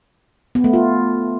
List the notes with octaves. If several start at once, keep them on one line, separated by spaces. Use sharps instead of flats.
B3
A3
F4